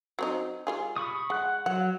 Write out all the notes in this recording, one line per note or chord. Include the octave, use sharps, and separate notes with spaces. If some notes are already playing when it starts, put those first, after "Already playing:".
F#3 C4 D#4
G3 F4 G#4
B5 C#6 D#6
G#3 F#5 F#6
F#3 F#5